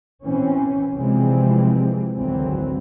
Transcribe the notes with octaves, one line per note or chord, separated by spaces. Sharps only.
B2 E3 C4 C#4
C3 E3 F3 G3 G#3 C4
G#1 D2 E3 F#3 C4